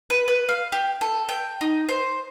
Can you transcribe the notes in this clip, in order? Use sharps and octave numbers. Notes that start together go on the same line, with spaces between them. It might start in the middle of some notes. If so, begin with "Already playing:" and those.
B4
B4
F5
G4
A4
G5
D#4
C5